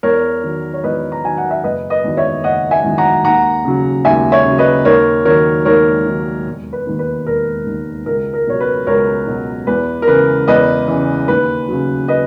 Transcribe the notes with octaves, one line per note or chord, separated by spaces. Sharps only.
E2 A#4 C#5
D#3 F#3
C#5
E2 B4 D#5
A#5
D#3 F#3 G#5
F#5
E5
F#1 B4 D#5
B4 D#5
E2 D#3 F#3
C#5 E5
F#1 D#5 F#5
E5 G#5
E2 D#3 F#3
F#5 A#5
D#2 F#5 A#5
C#3 F#3
D#2 E5 G#5
C#5 E5
C#3 F#3
B4 D#5
D#2 A#4 C#5
D#3 F#3 A#4 C#5
D#2 A#4 C#5
D#3 F#3
E1
B4
D#2 D#3
B4
E1 A#4
D#2 D#3
C#2 A#4
A#4
B2 F#3 C#5
B4
C#2 A#4 C#5
B2 F#3
E2 B4
A#4
C#3 E3 B4
E2 B4 D#5
C#3 E3
D#2 B4
C#3 F#3
B4 D#5